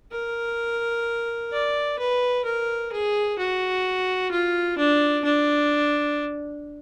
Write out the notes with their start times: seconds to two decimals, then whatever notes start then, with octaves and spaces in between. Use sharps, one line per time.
0.12 A#4
1.52 D5
1.99 B4
2.45 A#4
2.92 G#4
3.39 F#4
4.32 F4
4.78 D4
5.24 D4